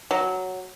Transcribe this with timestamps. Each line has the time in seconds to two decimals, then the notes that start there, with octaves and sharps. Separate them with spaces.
0.11 F#3